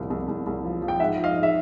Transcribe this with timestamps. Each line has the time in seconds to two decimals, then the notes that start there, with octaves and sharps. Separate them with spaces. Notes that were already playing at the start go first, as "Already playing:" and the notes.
Already playing: C2 A#2 F3
0.10 C2
0.28 C2
0.47 C2
0.65 F3
0.81 F3
0.88 G5
1.00 G#2 E5 F#5
1.17 F3
1.24 D#5 F5
1.36 G#2
1.43 E5